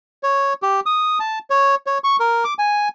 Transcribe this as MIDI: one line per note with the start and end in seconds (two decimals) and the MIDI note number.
0.23 0.53 73
0.63 0.80 67
0.86 1.18 87
1.20 1.39 81
1.50 1.75 73
1.87 1.98 73
2.04 2.16 85
2.20 2.44 70
2.44 2.54 86
2.59 2.88 80